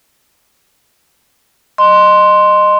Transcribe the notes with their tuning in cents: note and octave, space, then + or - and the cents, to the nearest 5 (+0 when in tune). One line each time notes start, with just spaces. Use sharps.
D#5 -20 C6 +0